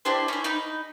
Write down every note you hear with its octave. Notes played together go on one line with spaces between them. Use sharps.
D4 E4 G4 C5
C#4 E4
D#4 B5